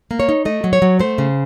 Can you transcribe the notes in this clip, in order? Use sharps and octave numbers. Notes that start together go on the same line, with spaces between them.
A#3
C#5
D#4
A3 D#5
F#3
C#5
F#3
A3 C5
C#3